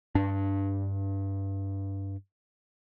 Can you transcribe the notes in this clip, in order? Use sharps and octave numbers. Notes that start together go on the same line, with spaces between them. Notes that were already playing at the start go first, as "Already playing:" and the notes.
G2 D4